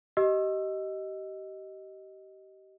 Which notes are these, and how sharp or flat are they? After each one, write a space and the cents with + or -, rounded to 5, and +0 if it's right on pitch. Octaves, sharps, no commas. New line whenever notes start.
G4 -30 D#5 +5 E6 +20